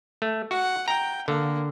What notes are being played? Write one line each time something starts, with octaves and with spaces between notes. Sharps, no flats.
A3
F#4 F#5
G5 A#5
D3 A#3